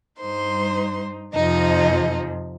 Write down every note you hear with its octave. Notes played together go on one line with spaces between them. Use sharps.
G2 G3 D#4 C5 C6
F2 C3 F3 D#4 D#5